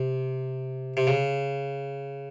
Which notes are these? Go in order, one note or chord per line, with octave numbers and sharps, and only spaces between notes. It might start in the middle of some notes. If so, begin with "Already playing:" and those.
Already playing: C3
C3
C#3